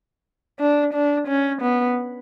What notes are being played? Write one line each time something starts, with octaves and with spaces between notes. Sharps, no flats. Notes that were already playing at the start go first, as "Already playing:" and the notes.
D4
D4
C#4
B3